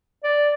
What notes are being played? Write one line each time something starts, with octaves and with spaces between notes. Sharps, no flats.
D5